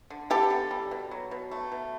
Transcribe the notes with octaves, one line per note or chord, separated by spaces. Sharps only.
D3
B3 G4 A4
D3
G3
B2
F#3
B2
A3
B2